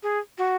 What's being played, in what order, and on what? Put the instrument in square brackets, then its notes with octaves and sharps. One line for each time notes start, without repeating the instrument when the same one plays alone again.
[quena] G#4
F#4